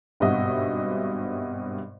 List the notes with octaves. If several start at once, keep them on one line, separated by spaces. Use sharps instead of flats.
G#1 G2 B2 F#4 D#5 E5